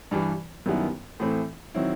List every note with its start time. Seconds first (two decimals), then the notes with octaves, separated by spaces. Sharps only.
0.11 G2 E3 G3
0.66 F#2 D#3 G3 B3 E4
1.20 A2 E3 A3 C4
1.74 D#3 F#3 C4 E4